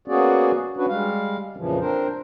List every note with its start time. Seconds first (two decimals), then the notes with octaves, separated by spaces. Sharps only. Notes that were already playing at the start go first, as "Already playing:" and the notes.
0.08 A#3 B3 C#4 F#4 G#4 D5
0.77 C#4 D4 F#4 B4
0.89 G3 G#3 F5
1.57 F2 A#2 C#3 E3 F3
1.79 C4 D4 A#4 C5